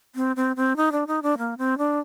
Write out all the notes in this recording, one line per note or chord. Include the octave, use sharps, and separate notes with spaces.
C4
C4
C4
D#4
D4
D#4
D4
A#3
C4
D4